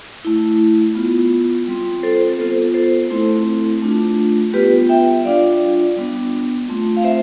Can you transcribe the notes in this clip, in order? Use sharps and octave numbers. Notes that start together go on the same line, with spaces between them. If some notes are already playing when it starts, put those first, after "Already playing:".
A3 E4
B3 F4
G3 C4 F4
A4 C5
B3 F4 A4 C5
A4 C5
A3 C4 E4
A3 D4 F4
G3 B3 F4 G4 B4
E5 G5
G3 D4 F4 D5 F5
G3 B3 D4
A3 C4 F4
F5
C5 E5